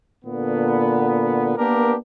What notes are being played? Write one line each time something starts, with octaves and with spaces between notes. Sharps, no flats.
A#2 D3 B3
A#3 B3 D4 G4 A#4